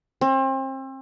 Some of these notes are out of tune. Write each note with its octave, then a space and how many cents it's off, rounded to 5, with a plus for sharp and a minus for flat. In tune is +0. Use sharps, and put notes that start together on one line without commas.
C4 +35